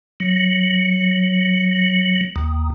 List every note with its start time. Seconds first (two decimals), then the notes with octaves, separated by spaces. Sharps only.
0.20 F#3
2.36 D#2